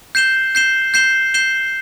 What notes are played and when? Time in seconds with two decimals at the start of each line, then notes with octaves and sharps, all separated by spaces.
0.15 G6 C7 E7 G7
0.55 G6 C7 E7 G7
0.94 G6 C7 E7 G7
1.34 G6 C7 E7 G7